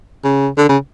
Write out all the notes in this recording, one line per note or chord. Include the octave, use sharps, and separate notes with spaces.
C#3
D3
C#3